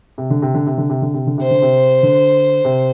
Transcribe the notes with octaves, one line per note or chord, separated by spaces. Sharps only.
C3
D3
C3
D3
C3
D3
C3
D3
C3
D3
C3 C5
D3
C3
D3
C3